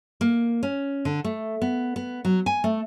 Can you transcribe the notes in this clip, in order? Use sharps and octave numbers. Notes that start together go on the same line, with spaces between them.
A#3
C#4
D3
A3
B3
B3
F#3
G#5
A3